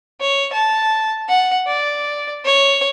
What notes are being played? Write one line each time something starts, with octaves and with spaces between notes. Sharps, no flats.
C#5
A5
F#5
D5
C#5